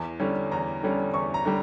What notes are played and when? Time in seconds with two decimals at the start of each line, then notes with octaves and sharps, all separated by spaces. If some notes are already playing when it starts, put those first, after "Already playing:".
Already playing: E2
0.20 D3 G3 C#4
0.51 E2 A#5
0.83 D3 G3 C#4
1.14 E2 C#6
1.34 A#5
1.45 D3 G3